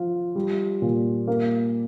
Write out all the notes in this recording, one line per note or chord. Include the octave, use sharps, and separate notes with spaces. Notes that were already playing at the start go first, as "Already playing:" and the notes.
Already playing: F3 F4
G3
A#2
A#3